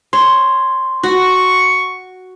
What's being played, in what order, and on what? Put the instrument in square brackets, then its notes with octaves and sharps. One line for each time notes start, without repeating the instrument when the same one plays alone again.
[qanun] C#5 [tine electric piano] C6
[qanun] F#4 [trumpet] C#6